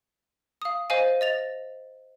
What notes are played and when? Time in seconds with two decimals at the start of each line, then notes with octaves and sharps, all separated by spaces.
0.62 F5 D#6
0.90 C5 D#5 F5 G#5
1.21 D#5 A6 F7